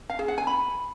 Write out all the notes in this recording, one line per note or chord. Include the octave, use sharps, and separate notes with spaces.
F5
G#4
F#5
G#5
B5